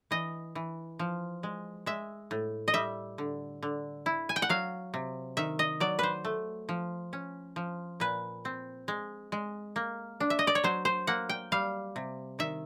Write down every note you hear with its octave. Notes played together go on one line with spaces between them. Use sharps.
E3 D#5
E3
F3
G#3
G#3 E5
A2
D#5
G3 E5
D3
D3
E4
G#5
G5
F#5
F#3 F5
C3
D#3 E5
D#5
F#3 D5
B4 C5
A3
F3
C#4
F3
A#2 B4
C4
G#3
G#3
A#3
D4
E5
D#5
D5
C#5
F#3 C5
C5
A#3 F#5
G5
G3 F5
C3
D#3 E5